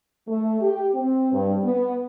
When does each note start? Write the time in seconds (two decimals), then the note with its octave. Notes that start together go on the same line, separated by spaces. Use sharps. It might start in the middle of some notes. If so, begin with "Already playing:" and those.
0.28 A3
0.61 G4
0.95 C4
1.33 G2
1.64 B3